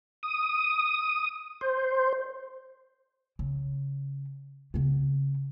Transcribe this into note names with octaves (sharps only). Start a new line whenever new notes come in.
D#6
C5
C#3
C#3 B3